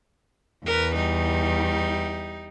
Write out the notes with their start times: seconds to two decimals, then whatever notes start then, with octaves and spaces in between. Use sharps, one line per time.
0.66 E2 A#4 B4
0.94 G3 D#4